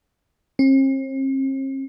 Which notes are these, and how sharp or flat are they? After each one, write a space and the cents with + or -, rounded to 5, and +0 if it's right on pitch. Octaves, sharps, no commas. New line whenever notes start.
C4 +45